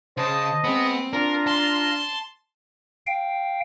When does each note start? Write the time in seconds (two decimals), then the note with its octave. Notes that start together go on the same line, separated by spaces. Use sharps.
0.17 C#3 C5 D#5 A5
0.64 G#3 B3 C4
1.13 D4 F4 A#4 A#5
1.47 A5 C6
3.07 F5 G5